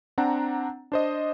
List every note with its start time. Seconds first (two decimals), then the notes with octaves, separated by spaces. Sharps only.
0.18 C4 D4 F#5 A#5
0.92 D4 C5 D#5